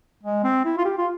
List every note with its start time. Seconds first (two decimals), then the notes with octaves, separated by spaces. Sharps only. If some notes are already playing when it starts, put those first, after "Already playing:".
0.23 G#3
0.44 C4
0.65 E4
0.77 F4
0.85 G4
0.98 F4